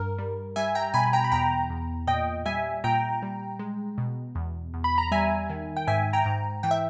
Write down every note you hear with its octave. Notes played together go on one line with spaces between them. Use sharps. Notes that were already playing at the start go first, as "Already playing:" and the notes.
Already playing: G2 A#4
G3
G3 E5 G#5
G5 A#5
B2 G#5 B5
G5 A#5
B5
E2 G5 A#5
E2
A#2 D#5 G5
G3 E5 G#5
A#2 G5 A#5
G3
G#3
B2
E2
E2
B5
A#5
G3 E5 G#5
D#3
G5
G#2 E5 G#5
G5 A#5
G#2
E3 G5
E5